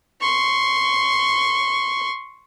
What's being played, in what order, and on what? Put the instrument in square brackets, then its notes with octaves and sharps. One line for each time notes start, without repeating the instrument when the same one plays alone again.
[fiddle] C6 C#6